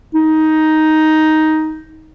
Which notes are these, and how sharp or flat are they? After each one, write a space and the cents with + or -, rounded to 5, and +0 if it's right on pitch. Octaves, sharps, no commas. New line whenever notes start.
D#4 +5